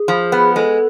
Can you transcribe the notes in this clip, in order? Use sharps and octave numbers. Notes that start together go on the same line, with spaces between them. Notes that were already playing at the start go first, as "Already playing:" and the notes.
Already playing: G#4
F3
B3
G#3 A4